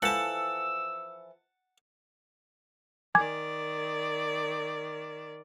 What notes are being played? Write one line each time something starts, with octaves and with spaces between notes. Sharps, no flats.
E3 F3 A4 F#5 A5 E6
D#3 D5 G#5 D6 G#6